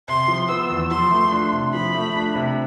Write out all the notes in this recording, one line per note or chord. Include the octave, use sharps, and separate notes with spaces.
C3 C6
F3
B3 E6
E2
F3 C6
A3
D4
C3
F3 B5
A3
D4
C3